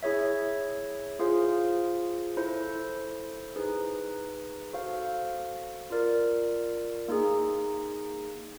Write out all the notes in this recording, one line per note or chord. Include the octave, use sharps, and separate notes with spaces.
E4 G#4 C#5 E5
F4 G#4 C5 F5
E4 A4 C5
D#4 G#4 B4
F#4 A4 C5 F5
F4 A#4 D5
A#3 D#4 G#4